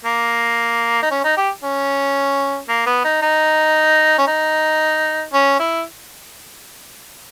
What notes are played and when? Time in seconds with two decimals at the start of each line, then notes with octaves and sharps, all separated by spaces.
0.05 A#3
1.02 D#4
1.11 C#4
1.24 D#4
1.37 G4
1.63 C#4
2.69 A#3
2.86 B3
3.04 D#4
3.22 D#4
4.18 C#4
4.27 D#4
5.33 C#4
5.59 E4